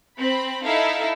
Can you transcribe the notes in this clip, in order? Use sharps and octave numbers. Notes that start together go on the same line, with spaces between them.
C4 B5
D#4 E4 A4 E5 F5